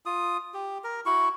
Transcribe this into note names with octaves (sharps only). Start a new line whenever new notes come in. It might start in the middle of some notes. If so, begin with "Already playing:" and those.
F4 D#6
G4
A#4
E4 F#4 C#6